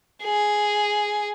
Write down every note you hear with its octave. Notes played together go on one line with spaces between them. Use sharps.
G#4